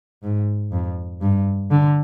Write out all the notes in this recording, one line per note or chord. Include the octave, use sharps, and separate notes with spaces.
G#2
F2
G2
D3